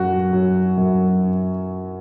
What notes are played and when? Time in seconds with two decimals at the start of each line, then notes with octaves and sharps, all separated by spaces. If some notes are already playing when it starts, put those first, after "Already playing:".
Already playing: F#2 F#3 F#4
0.33 F#3
0.78 F#2